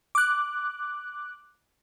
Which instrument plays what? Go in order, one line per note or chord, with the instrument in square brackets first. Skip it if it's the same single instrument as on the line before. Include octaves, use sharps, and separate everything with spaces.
[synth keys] D6 F#6